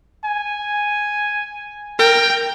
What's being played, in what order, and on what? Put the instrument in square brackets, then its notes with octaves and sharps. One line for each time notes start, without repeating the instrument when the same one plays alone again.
[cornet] G#5
[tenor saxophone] A#4 [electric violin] G5